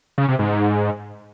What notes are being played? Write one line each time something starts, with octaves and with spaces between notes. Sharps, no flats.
C#3
C3
G#2